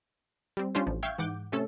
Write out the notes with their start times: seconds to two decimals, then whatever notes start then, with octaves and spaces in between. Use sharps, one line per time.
0.57 G3 C4
0.75 G3 C#4 D4 F4 C5
0.87 A1 F3
1.03 E5 F5 G5 C#6 G6 G#6
1.18 G#2 E3 F#5 D6 G6
1.52 C3 A3 C#4 A4